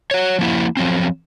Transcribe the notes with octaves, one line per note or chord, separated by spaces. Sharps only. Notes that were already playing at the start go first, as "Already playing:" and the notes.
F#4 C#5
F3 A#3 E4
F3 F#3 C4